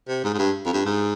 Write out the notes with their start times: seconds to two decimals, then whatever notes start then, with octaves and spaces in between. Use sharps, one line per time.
0.08 C3
0.24 G#2
0.34 G#2
0.38 G2
0.66 F2
0.73 G2
0.85 G#2